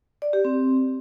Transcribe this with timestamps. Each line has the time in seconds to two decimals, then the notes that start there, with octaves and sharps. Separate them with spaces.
0.22 D5
0.33 G4
0.45 C4